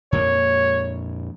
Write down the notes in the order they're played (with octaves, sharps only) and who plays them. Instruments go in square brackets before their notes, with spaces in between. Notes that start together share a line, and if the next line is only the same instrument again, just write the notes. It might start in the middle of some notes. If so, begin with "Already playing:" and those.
[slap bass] F2 A#2 A#3 [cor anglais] C#5